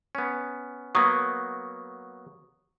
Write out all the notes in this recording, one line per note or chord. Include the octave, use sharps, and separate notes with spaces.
B3 C#4
F#3 A#3 B3 C#6 D#6